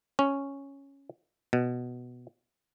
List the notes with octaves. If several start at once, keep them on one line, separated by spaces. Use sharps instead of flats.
C#4
B2